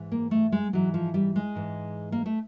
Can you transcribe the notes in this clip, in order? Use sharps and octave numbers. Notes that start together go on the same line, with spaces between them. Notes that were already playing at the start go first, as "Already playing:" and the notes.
Already playing: G#2 E3
A#3
A3
G#3
G#2 E3 F#3
F3
G3
G#3
G#2 E3
A#3
A3